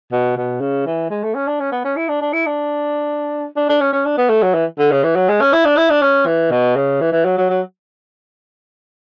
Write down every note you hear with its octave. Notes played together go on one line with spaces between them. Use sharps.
B2
B2
C#3
E3
G#3
A3
C#4
D4
C#4
B3
C#4
E4
D4
D4
E4
D4
D4
D4
C#4
C#4
D4
B3
A3
F#3
E3
D3
C#3
E3
F#3
G#3
C#4
E4
D4
E4
D4
C#4
E3
B2
C#3
E3
E3
F#3
F#3
F#3